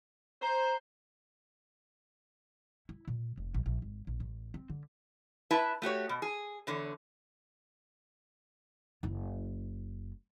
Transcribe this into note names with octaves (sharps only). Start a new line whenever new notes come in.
C5 A#5
E4
A#2
F1
A#1
A#1
G#1
A#1
A1
C4
D3
E4 B4 E5 A5
A3 F#4 G4 C#5
B2
G#4
E2 D3 C#5
F#1 E4